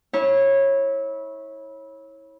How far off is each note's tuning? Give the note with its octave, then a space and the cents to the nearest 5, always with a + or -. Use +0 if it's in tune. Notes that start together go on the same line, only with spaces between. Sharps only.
E4 -25 C#5 -20